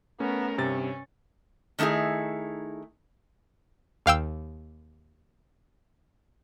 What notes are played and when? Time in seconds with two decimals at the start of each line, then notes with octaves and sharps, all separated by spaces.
0.20 A3 B3 C#4 A#4
0.58 G2 C3 C#4 A6
1.79 D#3 A3 D#4 E4 G#4
4.06 D#2 F5 G5 E6